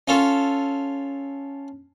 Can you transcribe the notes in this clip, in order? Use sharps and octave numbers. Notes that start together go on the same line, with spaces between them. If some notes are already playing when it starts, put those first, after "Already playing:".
C#4 F4 A4